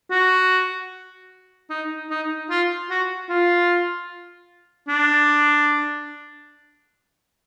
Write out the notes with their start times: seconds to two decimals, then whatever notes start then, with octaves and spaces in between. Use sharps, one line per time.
0.11 F#4
1.70 D#4
2.10 D#4
2.50 F4
2.90 F#4
3.30 F4
4.89 D4